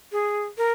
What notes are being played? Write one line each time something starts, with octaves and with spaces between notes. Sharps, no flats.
G#4
A#4